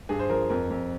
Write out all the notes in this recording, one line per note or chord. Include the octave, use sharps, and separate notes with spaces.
G2 G#4
C5
F3 A#4
F2 A#4
F2